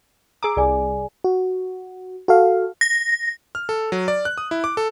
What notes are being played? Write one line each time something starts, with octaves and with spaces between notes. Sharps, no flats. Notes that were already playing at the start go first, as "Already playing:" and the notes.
G#4 A#5 D6 E6
C2 G#4 D5 G#5
F#4
F#4 A4 F5
A#6
F6
A4
F#3
D5
F#6
D#6
E4
D6
A4